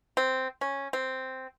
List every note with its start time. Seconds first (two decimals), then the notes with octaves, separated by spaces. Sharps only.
0.17 C4
0.61 C#4
0.93 C4